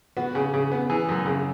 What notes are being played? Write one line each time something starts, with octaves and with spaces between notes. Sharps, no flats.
B3 F#4
C#3
C#3
B3
E3 G#4
F#2
C#3